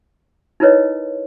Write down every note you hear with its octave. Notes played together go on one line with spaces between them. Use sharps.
D#4 E4 A#4 B4 C#5 D#5